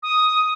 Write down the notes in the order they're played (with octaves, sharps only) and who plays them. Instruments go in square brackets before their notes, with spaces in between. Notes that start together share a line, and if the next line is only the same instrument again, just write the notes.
[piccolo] D#6